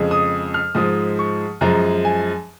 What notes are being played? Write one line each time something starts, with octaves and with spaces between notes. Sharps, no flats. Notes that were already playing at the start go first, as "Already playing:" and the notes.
Already playing: F2 C#3 G#3
D#6
F6
G#2 F3 G#3 D#6
C#6
F#2 F3 G#3 A#5
G#5